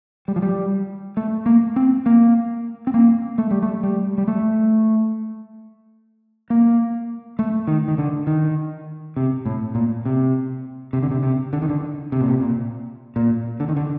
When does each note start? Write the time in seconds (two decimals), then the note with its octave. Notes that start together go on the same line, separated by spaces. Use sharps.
0.28 G3
0.36 F3
0.42 G3
1.17 A3
1.46 A#3
1.76 C4
2.06 A#3
2.87 C4
2.94 A#3
3.38 A3
3.51 G3
3.62 A3
3.83 G3
4.18 G3
4.28 A3
6.50 A#3
7.39 A3
7.67 D#3
7.88 D#3
7.98 D3
8.27 D#3
9.16 C3
9.46 A2
9.75 A#2
10.05 C3
10.93 C3
11.03 D3
11.11 C3
11.23 C3
11.53 D3
11.62 D#3
11.70 D3
12.12 C3
12.21 A#2
12.28 C3
12.41 A#2
13.16 A#2
13.60 D3
13.68 D#3
13.76 D3